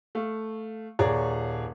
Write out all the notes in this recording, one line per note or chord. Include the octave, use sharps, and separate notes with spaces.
A3 F5
D#1 G#4 C#5 D5 A#5